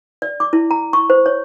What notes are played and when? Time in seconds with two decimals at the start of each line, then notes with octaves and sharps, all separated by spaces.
0.22 D5
0.40 D6
0.53 E4
0.71 A#5
0.93 C#6
1.10 C5
1.26 C#5